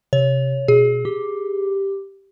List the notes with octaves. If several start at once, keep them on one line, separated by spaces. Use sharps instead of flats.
C3 C#5
B2 G#4
G4